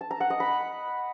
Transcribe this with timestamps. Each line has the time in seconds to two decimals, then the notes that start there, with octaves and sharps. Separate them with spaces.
0.01 A5
0.11 A#5
0.20 F#5
0.30 D#5
0.40 B5